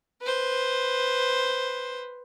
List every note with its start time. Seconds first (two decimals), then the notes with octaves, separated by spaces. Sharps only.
0.22 B4 C5